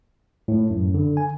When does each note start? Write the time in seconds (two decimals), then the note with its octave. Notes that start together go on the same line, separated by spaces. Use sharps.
0.48 A2
0.70 F#2
0.94 D3
1.17 G#5